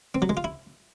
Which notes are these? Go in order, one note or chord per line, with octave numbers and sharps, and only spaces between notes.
C4
F#3
G#3
F4
E4